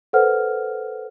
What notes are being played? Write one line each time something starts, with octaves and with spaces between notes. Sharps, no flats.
A4 B4 C5 F#5 F6